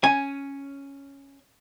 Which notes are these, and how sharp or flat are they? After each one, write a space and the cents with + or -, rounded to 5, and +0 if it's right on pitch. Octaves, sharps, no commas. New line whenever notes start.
C#4 +0 G#5 +0